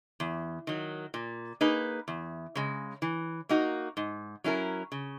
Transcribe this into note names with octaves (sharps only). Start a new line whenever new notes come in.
E2
D#3 F#3
A#2
A#3 D#4 G#4 B4
E2
C#3 G#3
E3
A#3 D#4 F#4
G#2
F#3 C#4 E4 A#4
C#3